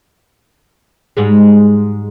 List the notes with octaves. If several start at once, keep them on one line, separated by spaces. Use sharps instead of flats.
G#2 G3 G#3